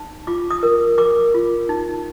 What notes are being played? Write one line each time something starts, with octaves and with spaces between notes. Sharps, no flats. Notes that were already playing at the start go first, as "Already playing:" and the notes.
Already playing: D#4
F4 D6
D#6
A#4
A#4 D6
F4
D#4